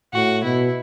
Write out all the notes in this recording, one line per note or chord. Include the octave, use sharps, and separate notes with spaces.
A2 F#4
B2 E4